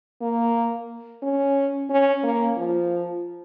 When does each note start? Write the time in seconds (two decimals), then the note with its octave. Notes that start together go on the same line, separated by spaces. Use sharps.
0.21 A#3
1.22 C#4
1.90 C#4
2.23 A#3
2.57 F3